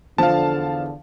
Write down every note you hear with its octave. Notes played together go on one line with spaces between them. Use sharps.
E2 D3 F3 F5 A5